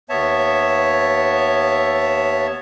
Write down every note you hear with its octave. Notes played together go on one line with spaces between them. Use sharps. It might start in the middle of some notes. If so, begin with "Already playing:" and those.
D#2 B3 C#5 E5 A5